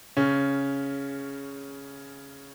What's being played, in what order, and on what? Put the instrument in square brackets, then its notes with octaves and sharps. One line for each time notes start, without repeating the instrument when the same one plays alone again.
[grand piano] C#3 C#4